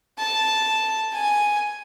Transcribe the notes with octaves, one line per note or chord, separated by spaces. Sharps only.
A5
G#5